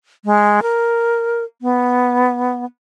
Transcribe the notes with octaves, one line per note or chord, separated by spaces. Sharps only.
G#3
A#4
B3